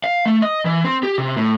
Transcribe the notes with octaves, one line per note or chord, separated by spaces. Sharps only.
F5
A3
D#5
E3
C4
G4
C3
A2